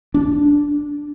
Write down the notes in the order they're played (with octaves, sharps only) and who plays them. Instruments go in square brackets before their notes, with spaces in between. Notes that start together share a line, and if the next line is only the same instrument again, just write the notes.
[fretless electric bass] D4